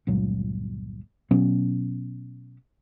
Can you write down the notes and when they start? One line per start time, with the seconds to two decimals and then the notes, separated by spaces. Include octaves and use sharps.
0.07 G1 C#2 A#2 F#3
1.31 B2 F#3 B3 C#4